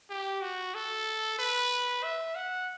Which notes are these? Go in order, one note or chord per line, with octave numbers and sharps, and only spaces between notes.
G4
F#4
A4
B4
E5
F#5